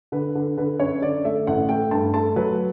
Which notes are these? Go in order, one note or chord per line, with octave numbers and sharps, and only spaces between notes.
D3 B4
D3
D3 B4
F#2 C#5
D3 D5
A3 E5
A1 F#5
A3 G5
G2 A5
A3 A5
F#3 B4